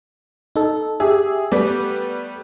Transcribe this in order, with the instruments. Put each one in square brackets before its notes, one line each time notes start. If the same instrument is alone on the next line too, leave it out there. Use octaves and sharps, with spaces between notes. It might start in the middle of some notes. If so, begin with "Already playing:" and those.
[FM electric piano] D#4 A4
[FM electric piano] G4 E5 [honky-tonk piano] G#4
[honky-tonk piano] G3 A3 B3 [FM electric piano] D5